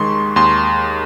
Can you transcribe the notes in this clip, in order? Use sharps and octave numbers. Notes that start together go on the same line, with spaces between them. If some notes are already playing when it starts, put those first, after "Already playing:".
Already playing: D#2 D#3 G#3 C6 C#6
D#2 C6